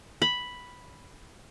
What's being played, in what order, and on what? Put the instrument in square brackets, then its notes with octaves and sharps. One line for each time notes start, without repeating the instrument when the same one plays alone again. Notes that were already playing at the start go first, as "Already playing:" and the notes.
[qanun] B5